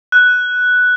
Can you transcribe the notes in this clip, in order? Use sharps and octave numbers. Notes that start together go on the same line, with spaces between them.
F#6